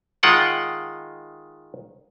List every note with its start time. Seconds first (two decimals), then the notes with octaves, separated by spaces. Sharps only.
0.23 D#3 G#3 F4 F#5 G5 A5